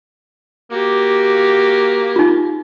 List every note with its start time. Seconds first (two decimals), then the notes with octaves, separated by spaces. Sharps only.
0.71 A#3 F#4 G4
2.16 D#4 F4